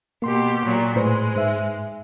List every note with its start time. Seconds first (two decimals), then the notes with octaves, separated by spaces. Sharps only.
0.22 B2 A#3 G4 C6
0.64 A#2 F#3
0.96 A2 G#3 B4 C5
1.36 G#2 E5